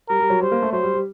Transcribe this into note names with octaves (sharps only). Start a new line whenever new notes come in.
G3 A#4
G3
F#3
G3 C5
A#3
A3
F#3 C5
G3
G3